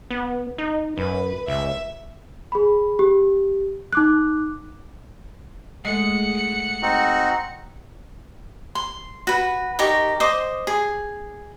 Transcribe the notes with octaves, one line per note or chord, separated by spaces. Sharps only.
B3
D#4
F#2 B4
C#2 E5
G#4 B5
G4
D#4 D6 F#6
G#3 A3 F#5 C#7
C4 D#4 F#4
C6
F#4 B4
D#4 G4 A#4 C#6
C5 D#5 D6
G#4